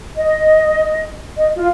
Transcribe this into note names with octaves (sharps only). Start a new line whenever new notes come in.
D#5
D#5
F4